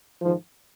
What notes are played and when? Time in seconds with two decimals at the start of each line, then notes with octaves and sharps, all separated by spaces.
0.21 G#2 D#3 F3